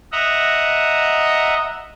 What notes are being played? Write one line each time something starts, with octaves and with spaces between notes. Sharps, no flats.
D#5 E5 F#5 A#5